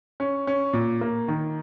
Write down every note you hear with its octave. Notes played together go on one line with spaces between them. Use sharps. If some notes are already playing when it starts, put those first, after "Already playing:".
C#4
C#4
A#2
A#3
D#3